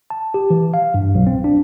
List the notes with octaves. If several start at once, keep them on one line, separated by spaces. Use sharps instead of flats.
A5
G4
E3
F5
G2
B1
C4
D4